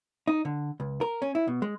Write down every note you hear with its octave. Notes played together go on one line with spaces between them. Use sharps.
D#4
D3
C#2
A#4
C#4
E4
B2
G#3